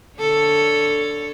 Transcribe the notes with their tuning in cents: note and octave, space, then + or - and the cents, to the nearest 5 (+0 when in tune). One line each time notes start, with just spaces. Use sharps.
D3 +0 A4 +5 C#5 +5